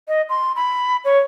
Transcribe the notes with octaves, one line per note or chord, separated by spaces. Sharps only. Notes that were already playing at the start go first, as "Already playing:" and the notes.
D#5
C6
B5
C#5